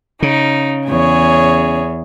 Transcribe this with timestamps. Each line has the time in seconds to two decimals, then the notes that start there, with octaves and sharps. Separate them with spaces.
0.22 C#3 D#4
0.88 E2 G#4 C#5